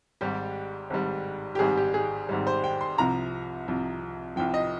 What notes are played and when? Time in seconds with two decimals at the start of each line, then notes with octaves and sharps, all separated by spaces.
0.21 G#1 G#2 G3 G4
0.90 G#1 G#2 G3
1.55 G4
1.59 G#1 G#2 G3 G#4
1.77 G4
1.94 G#4
2.29 G#1 G#2 G3
2.47 C5
2.64 G5
2.81 C6
2.98 C2 C3 F3 A#5
3.68 C2 C3 F3
4.36 C2 C3 F3 G5
4.54 D#5